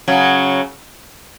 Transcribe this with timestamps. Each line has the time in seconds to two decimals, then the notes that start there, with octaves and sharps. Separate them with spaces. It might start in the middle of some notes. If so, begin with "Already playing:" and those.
0.08 C#3 F#3